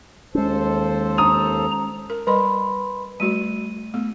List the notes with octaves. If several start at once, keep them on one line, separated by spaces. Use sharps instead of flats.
D#2 G#3 C#4 A4 C5
A#5 D#6
A#4
G3 A#4 B4 D#5 B5 C6
G3 A3 F#4 D#7
A3 B3